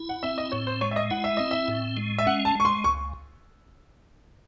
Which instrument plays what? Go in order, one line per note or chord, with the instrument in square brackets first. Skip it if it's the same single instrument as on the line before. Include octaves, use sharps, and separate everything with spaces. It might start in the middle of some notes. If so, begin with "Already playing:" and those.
Already playing: [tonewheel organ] E4
[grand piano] F#5
[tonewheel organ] C4 [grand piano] E5
[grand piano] D#5
[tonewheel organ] A2 [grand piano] C#5
[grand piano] C5
[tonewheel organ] G#3 [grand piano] C#5
[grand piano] E5
D#5
[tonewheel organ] E4 [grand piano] F#5
[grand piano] E5
[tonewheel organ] C4 [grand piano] D#5
[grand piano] E5
[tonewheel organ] A2
G#3
[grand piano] E5
[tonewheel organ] C#4 [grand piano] F#5
[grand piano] A5
[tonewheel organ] G#3 [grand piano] C#6
[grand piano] C6
[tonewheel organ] C#2 [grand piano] C#6